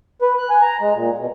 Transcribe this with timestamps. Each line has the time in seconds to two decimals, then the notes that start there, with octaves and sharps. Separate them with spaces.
0.22 B4
0.38 F#6
0.50 G#5
0.61 A#5
0.81 G#3
0.95 A#2
1.18 B2